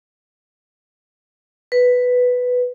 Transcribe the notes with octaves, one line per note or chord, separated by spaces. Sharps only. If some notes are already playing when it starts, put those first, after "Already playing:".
B4